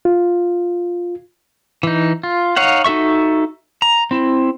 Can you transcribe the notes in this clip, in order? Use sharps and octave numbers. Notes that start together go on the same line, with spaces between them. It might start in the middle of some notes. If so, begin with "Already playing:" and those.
F4
E3 D#4
F4
D#4 C#5 F5 F#5
D#4 F#4 A4 E5 C#6
A#5
C4 E4